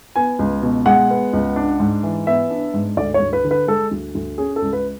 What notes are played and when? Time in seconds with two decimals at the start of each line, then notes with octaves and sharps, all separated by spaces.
0.16 B3 G#5
0.39 C#2
0.62 B2
0.86 G#3 F#5
1.10 B3
1.33 C#2
1.56 D4
1.80 G#2
2.03 E3
2.27 B3 E5
2.50 D4
2.74 G#2
2.97 D2 D5
3.14 C#5
3.20 D2
3.33 B4
3.44 D3
3.51 B4
3.67 G#3 A4
3.91 D2
4.15 D2
4.38 C#4 G#4
4.56 A4
4.62 C#2
4.73 B4